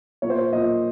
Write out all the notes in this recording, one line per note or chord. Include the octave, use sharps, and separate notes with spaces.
A#2 C#5
C5
C#5
A#2 D#5